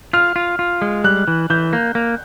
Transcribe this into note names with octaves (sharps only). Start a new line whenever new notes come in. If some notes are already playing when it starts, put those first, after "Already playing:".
F4 F6
F4
F4
G#3
G3 F#6
E3
E3 G6
A#3
A#3